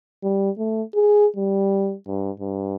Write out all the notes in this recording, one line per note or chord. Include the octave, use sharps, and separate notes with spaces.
G3
A3
G#4
G3
G2
G2